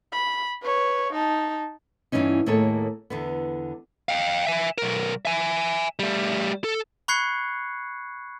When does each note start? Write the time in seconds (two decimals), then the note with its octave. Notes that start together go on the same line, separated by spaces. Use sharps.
0.12 B5
0.63 B4 C#5
1.13 D#4 A5
2.12 G2 B2 E3 B3 C#4 D#4
2.46 D#2 A2 A#3 G#4 A4 C#5
3.10 E2 D3 B3
4.09 F5 G5
4.47 E5 G#5
4.78 B1 A#4
5.25 E5 G#5
5.99 G3 A3
6.64 A4
7.08 B5 C#6 F#6 G#6 C7 C#7